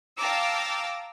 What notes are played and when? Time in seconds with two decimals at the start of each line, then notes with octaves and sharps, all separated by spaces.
0.18 F5 G5 A5 A#5 D6 E6